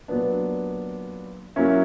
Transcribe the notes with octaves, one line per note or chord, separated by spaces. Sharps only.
A#2 F#3 B3 D4
F#3 A#3 C#4 E4